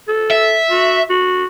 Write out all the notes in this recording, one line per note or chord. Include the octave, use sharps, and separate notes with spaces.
A4
E5
F#4
F#4